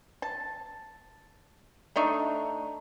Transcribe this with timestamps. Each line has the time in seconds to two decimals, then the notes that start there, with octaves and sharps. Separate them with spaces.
0.22 A5
1.96 A3 D4 D#4 C#6